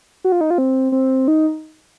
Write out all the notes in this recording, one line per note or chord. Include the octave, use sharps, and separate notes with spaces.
F#4
F4
D#4
F4
C4
C4
D#4